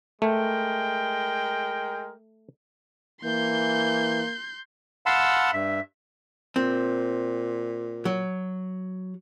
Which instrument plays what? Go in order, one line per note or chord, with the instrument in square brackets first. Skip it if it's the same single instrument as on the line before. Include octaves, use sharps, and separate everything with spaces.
[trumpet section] G#3 A#4 G5 [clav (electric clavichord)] A3
[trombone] E3 [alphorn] A#3 [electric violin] C6 G6
[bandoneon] F5 F#5 A5 B5 C6 E6
G2 E5
[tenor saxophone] A#2 [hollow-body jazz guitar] C4
[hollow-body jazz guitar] F#3